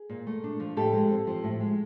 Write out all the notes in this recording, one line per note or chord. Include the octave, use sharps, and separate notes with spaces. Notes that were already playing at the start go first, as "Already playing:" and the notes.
Already playing: G#4
A#2
A3
D4
F3
A2 G4 A4
G#3
C4
F3
A2
G#3